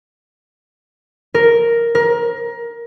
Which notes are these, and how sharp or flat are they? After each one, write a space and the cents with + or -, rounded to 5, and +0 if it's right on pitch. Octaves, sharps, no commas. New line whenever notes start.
A#4 +0
A#4 +20